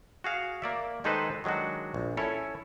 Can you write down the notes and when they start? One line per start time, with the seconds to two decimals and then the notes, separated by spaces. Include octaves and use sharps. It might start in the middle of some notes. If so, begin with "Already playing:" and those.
0.24 F#4 G#4 F5
0.62 A#3 D5 E5
1.04 D#3 G#3 D#4 A4 B4 C5
1.44 D#3 F#3 G#3 D4 F#4
1.94 A#1
2.17 C#4 E4 A4 C#5